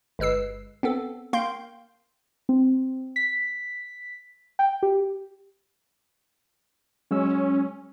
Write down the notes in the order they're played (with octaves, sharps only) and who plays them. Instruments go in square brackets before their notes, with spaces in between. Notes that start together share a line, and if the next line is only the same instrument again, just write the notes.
[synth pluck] G1 G#3 B4 E6 C7
B3 C4 A4
A#3 F5 G5 C6 G6
[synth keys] C4
B6
G5
G4
[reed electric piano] F#3 G#3 E6 [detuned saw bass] C#4